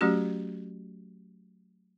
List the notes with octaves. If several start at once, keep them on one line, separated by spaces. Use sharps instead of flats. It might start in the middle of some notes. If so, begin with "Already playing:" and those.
F#3 A3 C#4 F#4 G4